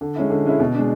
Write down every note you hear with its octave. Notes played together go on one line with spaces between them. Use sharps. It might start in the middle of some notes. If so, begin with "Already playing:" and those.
D3
G#3 C#4 E4
D3
G#3 C#4 E4
B2
G#3 D4